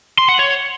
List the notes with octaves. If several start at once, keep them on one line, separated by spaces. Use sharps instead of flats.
C6
F#5
C#5